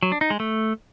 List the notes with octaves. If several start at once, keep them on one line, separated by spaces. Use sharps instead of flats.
F#3
D4
D#4
G#3
A3